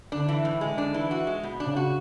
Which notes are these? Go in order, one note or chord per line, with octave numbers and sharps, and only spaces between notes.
D3 D4
E3
A2
D3 G#3
D4
E3
F#4
G#3
B2
C#3 D4
F#4